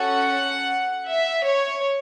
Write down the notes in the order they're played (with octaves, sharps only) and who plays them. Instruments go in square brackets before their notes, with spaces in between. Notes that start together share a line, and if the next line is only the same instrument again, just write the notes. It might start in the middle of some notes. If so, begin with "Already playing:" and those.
Already playing: [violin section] C#4 F#4 A4 F#5
E5
C#5